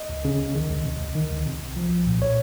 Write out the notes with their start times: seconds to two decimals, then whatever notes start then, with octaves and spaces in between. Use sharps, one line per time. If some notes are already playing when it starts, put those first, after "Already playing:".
Already playing: D#5
0.09 C#2
0.25 C#3
0.40 C#2
0.55 D#3
0.70 C#2
0.85 C3
1.00 C#2
1.15 D#3
1.31 C#2
1.46 C3
1.61 C2
1.76 F3
1.91 C2
2.06 A#2
2.22 C#5